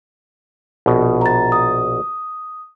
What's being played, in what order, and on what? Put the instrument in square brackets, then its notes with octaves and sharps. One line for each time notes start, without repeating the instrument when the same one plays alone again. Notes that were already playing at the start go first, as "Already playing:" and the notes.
[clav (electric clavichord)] A#1 B2
[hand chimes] A#5 A6
D#6